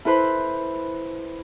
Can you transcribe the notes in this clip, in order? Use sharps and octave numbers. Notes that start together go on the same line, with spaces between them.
E4 A4 B4 C5 B5